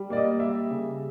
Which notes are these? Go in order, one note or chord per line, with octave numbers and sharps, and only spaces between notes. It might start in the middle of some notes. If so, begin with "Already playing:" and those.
Already playing: G3
A#3 D5
D#5
G3 E5
C#3